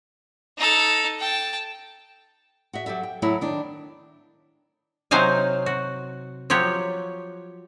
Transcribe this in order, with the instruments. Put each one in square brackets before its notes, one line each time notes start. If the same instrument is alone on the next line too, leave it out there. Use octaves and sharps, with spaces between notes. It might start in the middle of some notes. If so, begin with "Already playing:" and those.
[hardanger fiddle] D#4 A4
G5 A5
[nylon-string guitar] F#4 G#4 E5
F#3 G4 A4 E5
G5
F#3 A3 A#3 E4 G#4 C#5
D#3 D4
[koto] C3 F#3 D#4 C5 F5 G#5
F#4
F3 F#3 G4 C#5